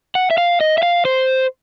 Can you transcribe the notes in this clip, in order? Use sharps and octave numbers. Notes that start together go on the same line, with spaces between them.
F#5
E5
F5
D#5
E5
F5
C5